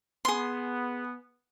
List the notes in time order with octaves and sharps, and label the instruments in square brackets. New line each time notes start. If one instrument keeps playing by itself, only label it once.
[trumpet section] B3 [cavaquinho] G#4 C6